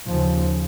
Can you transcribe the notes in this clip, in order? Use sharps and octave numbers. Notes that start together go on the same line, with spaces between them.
D#2 C#3 F3